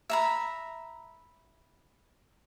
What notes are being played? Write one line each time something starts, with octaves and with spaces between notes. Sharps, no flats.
E5 A#5 B5